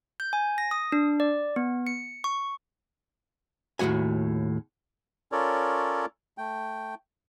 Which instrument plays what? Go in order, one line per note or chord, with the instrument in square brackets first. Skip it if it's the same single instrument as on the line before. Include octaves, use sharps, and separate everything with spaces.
[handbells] G6
G#5
A#6
D#6
D4
D5
B3
C#7
C#6
[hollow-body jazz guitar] D#2 A2 G#3 F#4 G#5
[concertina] C#4 F4 A4 A#4 C#5 D5
A3 G5